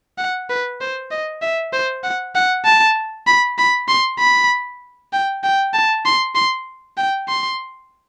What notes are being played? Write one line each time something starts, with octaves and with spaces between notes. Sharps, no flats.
F#5
B4
C5
D#5
E5
C5
F#5
F#5
A5
B5
B5
C6
B5
G5
G5
A5
C6
C6
G5
C6